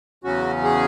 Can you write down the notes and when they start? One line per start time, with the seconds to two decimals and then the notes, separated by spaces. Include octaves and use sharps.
0.24 E2 C#3 F#3 C#4 F#4
0.64 G#4